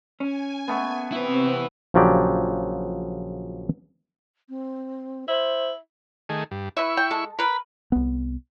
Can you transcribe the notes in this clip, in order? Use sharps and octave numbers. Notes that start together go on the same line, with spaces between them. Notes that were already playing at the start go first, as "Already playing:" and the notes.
C#4 G#5
A3 B3
C3 C4 E4 B4
A#1 C#3 F3 F#3 G4 D5
C4
E4 C5
D#3 A3 G#4
G2
E4 B4 E5 C#6
G5
G#3 A4
A#4 B4 B5
C2 B3